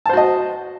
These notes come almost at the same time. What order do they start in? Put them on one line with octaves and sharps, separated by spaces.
A5 C5 F#4 D#5